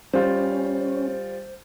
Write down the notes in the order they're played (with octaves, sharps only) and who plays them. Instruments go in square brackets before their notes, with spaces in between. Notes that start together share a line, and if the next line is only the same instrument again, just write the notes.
[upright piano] G3 F4 [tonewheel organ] C#4 [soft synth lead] C5